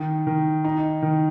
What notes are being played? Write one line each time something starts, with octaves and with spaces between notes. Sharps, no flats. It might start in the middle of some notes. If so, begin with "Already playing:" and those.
Already playing: D#3
D#3
D#4
D#3